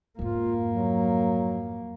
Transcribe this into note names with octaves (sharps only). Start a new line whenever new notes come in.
F2 G#2 A#3 F4
F#3